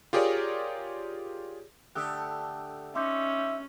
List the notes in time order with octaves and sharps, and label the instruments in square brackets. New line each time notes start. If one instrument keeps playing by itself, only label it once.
[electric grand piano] F4 G4 G#4 A#4 C#5 D5
[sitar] D3 A3 G4 [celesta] D#6 E6 F#6
[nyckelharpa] C#4 [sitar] D#4 [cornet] E5 [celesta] C6 D6 G6